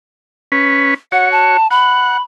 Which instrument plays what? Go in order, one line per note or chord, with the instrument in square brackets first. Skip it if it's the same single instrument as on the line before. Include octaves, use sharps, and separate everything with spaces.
[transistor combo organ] C#4 B4
[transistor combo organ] F#4 C#5 [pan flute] F#5
[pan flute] A5
[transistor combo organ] F#5 [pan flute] B5